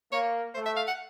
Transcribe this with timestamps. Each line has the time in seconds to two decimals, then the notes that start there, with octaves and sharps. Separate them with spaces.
0.12 A#3 C#5
0.55 A3 C5
0.66 E5
0.76 F5
0.88 F#5